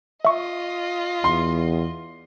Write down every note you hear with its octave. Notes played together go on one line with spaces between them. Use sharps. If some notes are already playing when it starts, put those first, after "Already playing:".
F4 D#5 E5 C#6
E2 C6